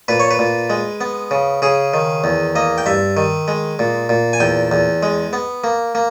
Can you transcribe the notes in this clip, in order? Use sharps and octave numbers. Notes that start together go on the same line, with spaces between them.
A#2 B4
C#5
B4
A#2
G#3
B3
C#3
C#3 G#4
D#3
E2
A#3 D#5
G5
G2 E5
D#3
G#3
A#2
A#2
G#5
E2 G5
E2
G#3
B3
A#3
A#3